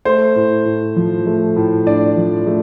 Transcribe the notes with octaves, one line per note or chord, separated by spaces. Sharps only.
A3 C5
A2
A2
F3
A3
A2
A2 D4 D5
F3
A3